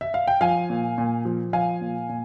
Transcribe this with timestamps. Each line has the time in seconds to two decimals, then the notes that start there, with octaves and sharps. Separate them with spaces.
0.01 E5
0.14 F5
0.28 G5
0.41 F3 F5 G#5
0.70 A#2
0.98 A#2
1.25 F3
1.53 F3 F5 G#5
1.81 A#2
2.09 A#2